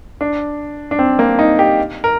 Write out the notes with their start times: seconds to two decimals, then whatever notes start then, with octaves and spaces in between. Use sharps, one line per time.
0.21 D4
0.91 D4
0.99 C4
1.19 A#3
1.39 D#4
1.59 G4
2.04 A#4